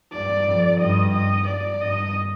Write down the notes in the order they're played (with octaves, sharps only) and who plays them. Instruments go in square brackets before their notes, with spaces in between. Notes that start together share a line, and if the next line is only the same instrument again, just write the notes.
[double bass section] G2 [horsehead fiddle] D5
[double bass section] F2
[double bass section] G2 [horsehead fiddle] D#5
[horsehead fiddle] D#5
D5
[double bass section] G2 [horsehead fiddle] D#5